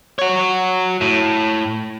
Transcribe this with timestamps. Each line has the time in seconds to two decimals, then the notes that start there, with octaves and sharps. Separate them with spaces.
0.19 F#4 C#5
1.01 A2